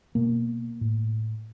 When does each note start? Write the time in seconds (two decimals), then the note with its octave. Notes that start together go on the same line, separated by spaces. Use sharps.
0.15 B2 A#3
0.81 A2